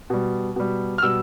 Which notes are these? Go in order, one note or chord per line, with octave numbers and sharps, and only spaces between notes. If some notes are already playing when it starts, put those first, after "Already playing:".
B2 G3
B2 G3
F6
B2 G3 E6